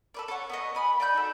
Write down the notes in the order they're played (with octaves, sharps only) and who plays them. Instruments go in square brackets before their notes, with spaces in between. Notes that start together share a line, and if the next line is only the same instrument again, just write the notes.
[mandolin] A4 B4 D5
A4 C#5 F#5
B3 C#5 D#5
G#5 B5 D#6
D5 D#5 B5 G6
D#4 F#4 A4